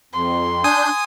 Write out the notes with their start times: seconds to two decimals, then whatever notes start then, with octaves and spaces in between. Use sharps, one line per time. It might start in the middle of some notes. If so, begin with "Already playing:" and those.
0.13 F2 C6
0.64 D4 G#5 D#6 G6